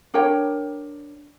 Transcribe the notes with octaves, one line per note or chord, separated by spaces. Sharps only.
D4 A#4 C#5 G5